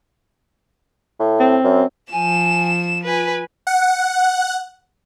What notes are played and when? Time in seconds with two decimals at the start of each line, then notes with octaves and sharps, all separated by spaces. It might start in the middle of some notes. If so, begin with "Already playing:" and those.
1.19 A2
1.40 C4
1.64 F#2
2.12 F3 G#5 E7
3.04 F4 B4 G#5
3.67 F#5